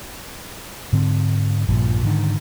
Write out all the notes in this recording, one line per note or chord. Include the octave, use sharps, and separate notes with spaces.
G#2 D3 C4
A#1 G2 A#2 F3
G#2 D3 D#3